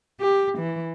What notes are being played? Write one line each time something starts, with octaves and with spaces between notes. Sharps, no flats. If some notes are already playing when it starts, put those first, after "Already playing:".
G4
E3